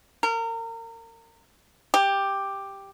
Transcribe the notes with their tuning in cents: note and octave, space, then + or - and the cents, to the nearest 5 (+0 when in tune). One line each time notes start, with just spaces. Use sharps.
A#4 -30
G4 +5